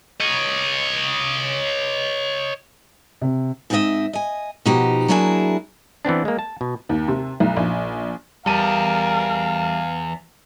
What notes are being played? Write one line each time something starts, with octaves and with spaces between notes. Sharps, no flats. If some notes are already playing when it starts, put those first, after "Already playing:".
C#5 D#5
C3
G#2 C4 F4 G4 D#5 E5
D#5 G#5
B2 F3 D#4 F#4 G4
F#3 A#3 D4 E4 G#4
E3 B3 C4 D4
G#3 A#3
A5
B2
D#2
C3
B1
A#1
E2 G3 A#4 F5 A5 D#7